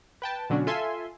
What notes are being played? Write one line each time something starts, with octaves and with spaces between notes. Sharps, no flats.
B4 G5 A5
B2 D3 F#3 C#4 D4 F#4
F4 A4 E5 G#5 C6